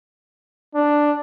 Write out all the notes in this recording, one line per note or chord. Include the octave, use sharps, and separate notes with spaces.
D4